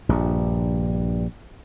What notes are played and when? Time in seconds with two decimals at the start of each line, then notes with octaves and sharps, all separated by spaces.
0.09 A#1 G2